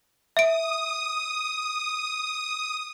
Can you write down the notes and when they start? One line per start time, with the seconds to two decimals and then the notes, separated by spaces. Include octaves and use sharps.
0.37 E5 D#6 D7